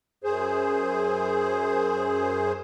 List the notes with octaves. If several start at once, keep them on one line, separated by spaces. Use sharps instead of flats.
F#2 G#4 C5